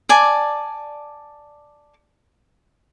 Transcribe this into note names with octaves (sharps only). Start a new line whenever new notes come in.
D5 G#5 A5